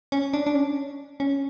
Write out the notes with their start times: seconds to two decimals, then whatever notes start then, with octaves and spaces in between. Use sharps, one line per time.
0.12 C#4
0.33 D4
0.46 D4
0.55 C#4
1.20 C#4